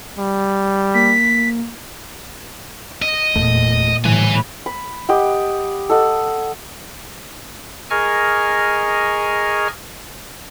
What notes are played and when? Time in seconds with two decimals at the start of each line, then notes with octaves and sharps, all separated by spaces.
0.18 G3
0.94 A#3 B6
3.02 D#5
3.35 F1 E2 A#2 A3
4.04 A2 D3 E3 G3 B4 G#5
4.66 B5
5.09 G4 D#5 F#5
5.90 A4 D#5 F#5
7.90 G#4 A#4 D#5 G#5 C#6 F6